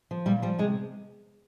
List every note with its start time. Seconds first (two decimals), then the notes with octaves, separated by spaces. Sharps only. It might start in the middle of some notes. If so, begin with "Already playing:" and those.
0.11 F3
0.26 A#2 G3
0.42 F3 G3
0.59 C3 G#3